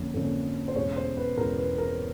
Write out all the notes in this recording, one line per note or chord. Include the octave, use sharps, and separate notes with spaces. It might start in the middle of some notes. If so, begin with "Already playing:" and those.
Already playing: F2 D3 F3 A#3 C#4
F2 D3 F3 A#3 C#4
C5
E2 B2 G#3 C#4 C#5
C5
B4
E2 B2 G#3 C#4 A#4
B4
A#4